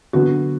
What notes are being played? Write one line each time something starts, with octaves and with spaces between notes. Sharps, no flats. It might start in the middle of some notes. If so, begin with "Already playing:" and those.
D3 F#3 B3 F#4